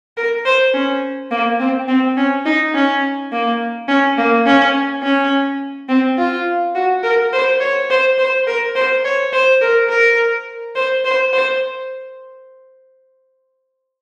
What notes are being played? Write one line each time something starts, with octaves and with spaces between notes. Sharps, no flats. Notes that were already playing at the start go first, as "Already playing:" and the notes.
A#4
C5
C#4
A#3
C4
C4
C#4
D#4
C#4
A#3
C#4
A#3
C#4
C#4
C4
F4
F#4
A#4
C5
C#5
C5
C5
A#4
C5
C#5
C5
A#4
A#4
C5
C5
C5